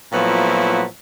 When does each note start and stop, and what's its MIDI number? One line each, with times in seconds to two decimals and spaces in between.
0.12 0.84 46
0.12 0.84 53
0.12 0.84 54
0.12 0.84 57
0.12 0.84 59
0.12 0.84 64